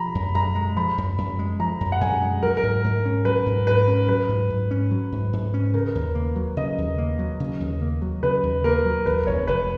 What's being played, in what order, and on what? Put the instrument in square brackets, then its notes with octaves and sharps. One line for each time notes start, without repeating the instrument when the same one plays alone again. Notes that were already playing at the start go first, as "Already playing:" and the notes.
Already playing: [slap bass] F3 [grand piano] A#5 B5
[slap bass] F#2
[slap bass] F#2 [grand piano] A#5
[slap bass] G#3
[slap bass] F3 [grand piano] B5
[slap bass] F#2
F#2
G#3
[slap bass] F3 [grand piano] A#5
[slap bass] F#2
[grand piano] F#5
[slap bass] F#2 [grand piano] G#5
[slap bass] G#3
[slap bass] F#3 [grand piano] A#4
[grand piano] A#4
[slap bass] G#2
G#2
C#4
[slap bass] F#3 [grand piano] B4
[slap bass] G#2
[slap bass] G#2 [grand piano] B4
[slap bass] C#4
[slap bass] F#3 [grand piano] B4
[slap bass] G#2
G#2
C#4
F#3
G#2
G#2
C#4
[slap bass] C#3 [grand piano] A#4
[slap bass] D#2
A#3
F#3
[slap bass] C#3 [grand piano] D#5
[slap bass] D#2
A#3
F#3
C#3
D#2
A#3
F#3
[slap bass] C#3 [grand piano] B4
[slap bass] D#2
[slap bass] A#3 [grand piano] A#4
[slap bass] F#3
[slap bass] D#2 [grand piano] B4
[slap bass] F1 [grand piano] C#5
[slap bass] F1 [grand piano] B4